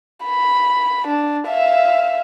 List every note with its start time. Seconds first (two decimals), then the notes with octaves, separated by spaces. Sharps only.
0.25 B5
1.08 D4
1.49 E5 F5